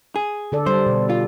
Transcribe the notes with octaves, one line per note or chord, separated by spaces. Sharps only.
G#4
D3 A4 D5
G3 C5
B2
F4